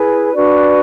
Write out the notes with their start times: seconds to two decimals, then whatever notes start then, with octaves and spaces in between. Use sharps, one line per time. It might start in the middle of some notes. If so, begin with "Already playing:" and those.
Already playing: E4 G#4 B4
0.33 D4 F#4 B4 D5